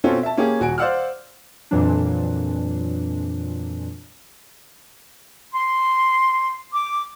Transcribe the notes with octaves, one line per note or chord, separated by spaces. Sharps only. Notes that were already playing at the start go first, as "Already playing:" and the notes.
B2 C4 C#4 F4 A4
E5 A5
A#3 C#4 G4 G#4
D#1 F#4 G#5 D7
C5 D5 F5 F#5 E6 F6
F2 A#2 E3 F#3 D4
C6
D6